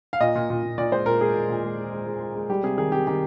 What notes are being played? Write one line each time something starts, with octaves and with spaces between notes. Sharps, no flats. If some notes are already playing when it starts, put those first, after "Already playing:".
F5
A#2 D#5
A#2
A#2
A#2
A#2 D5
G#3 C5
A#2 A#4
G#3 G#4
A#2
A#2
G#3
G#3
G#3
G#3
G#3
G#3
G3 G4
C3 G#4
D#3 G#4
C3 G4
D#3 G4